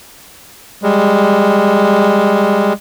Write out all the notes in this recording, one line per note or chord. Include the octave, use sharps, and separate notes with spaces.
G3 G#3